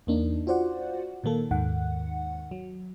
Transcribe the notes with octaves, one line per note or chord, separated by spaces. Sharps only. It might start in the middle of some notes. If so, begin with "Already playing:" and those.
E2 A#3 D4 D#4
F4 F#4 C5 D5 F#5
A#2 D#3 A#3 A4
D#2 G#2 D#3 F#5
F#3